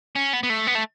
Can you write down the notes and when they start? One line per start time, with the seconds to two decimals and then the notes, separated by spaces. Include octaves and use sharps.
0.15 C#4
0.33 B3
0.43 B3
0.50 A3
0.67 B3
0.75 A3